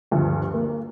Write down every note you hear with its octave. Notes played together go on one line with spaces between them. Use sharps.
D2 G2 F3
A#3